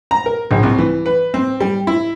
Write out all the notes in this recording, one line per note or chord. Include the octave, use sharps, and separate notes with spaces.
A#5
A#4
A#1
C2
E3
B4
C4
G3
E4